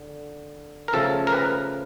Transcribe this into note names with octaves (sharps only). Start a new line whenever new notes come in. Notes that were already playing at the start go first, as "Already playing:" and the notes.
Already playing: D3
A#4
C#3 F3 A3 A4
A#4
B4